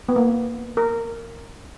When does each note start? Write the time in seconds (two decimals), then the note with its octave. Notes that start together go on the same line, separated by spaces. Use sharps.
0.09 B3
0.16 A#3
0.77 A#4